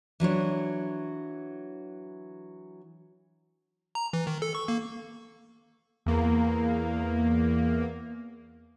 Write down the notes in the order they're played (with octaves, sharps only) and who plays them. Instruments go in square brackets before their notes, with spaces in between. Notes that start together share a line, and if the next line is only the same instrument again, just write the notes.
[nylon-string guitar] E3 F#3 D4 C#5
[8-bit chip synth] A#5
E3
D#3
A4
C#6
A#3
[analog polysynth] E2 A#3